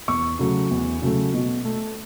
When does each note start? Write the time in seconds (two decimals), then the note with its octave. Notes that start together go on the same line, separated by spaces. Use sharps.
0.08 E2 C#6
0.39 C#3 F#3 A3
0.71 E2
1.02 C#3 F#3 A3
1.34 B2
1.65 A3